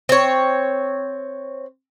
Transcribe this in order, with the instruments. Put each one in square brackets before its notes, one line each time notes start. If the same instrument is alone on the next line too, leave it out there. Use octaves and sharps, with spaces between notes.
[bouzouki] C4 C#5